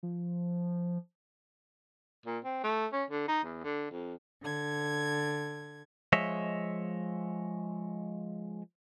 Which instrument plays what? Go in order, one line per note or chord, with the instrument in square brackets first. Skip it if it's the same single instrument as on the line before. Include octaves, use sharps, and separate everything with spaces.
[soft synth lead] F3
[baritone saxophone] A#2
C4
A3
C#4
D3
D#4
E2
D3
F2
[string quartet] D3 G#6
[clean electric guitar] F3 G#3 C#5 D#5 E5